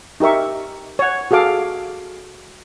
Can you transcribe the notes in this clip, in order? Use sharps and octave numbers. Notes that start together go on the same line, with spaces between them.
D#4 G4 A#4 E5 C#6
C#5 F#5
F#4 G#4 A4 F5 D6